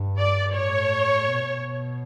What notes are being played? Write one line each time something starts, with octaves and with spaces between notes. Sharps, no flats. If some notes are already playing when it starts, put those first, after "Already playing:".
Already playing: G2
D5
A2 C#5
B2